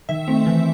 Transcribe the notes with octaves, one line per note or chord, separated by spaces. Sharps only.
D#3 E5
A3 C4
E3